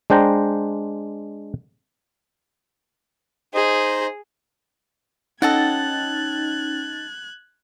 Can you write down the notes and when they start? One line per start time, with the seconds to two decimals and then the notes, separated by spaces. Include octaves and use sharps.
0.10 G#3 D4 C5 G5 A#5
3.54 D#4 G#4 C5 D#5
5.42 C#4 D#4 A4 D#5 F#5 F#6 G#6 A6